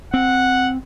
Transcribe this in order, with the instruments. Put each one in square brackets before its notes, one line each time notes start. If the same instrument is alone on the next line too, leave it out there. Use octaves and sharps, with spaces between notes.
[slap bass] C4 [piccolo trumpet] F#5